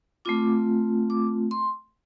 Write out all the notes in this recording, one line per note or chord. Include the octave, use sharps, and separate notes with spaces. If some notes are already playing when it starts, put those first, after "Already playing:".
A3 C4 F4 D6
D6
C6